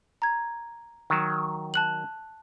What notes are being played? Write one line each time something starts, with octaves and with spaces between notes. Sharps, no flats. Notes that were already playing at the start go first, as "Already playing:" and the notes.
A#5 G#6
D#3 F#3
A5 F#6 F#7